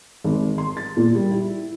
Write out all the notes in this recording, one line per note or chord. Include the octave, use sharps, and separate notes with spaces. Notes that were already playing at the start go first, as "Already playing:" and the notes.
G#1
C6
A6
A#2
G3
E4